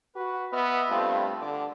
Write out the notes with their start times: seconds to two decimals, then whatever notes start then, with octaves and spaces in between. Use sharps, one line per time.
0.16 F#4 B4
0.53 B3 D#5 E5 F6
0.90 G2 A3 C4 F4
1.42 D3 D6